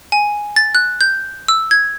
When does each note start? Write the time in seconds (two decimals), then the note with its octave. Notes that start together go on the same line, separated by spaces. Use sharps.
0.12 G#5
0.56 A6
0.75 F#6
1.01 G6
1.48 E6
1.71 G#6